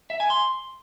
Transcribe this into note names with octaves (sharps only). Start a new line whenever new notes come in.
E5
G#5
C6